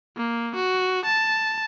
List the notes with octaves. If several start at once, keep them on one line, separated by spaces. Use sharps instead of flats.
A#3
F#4
A5